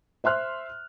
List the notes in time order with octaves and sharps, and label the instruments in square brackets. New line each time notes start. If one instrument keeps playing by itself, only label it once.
[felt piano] C5 E5 C6 F6 F#6